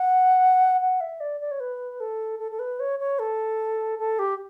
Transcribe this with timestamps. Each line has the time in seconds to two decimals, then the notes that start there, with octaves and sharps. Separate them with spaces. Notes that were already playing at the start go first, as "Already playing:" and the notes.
Already playing: F#5
0.81 F#5
1.01 E5
1.20 D5
1.41 D5
1.51 C#5
1.60 B4
2.00 A4
2.39 A4
2.52 A4
2.59 B4
2.80 C#5
2.99 C#5
3.19 A4
3.99 A4
4.19 G4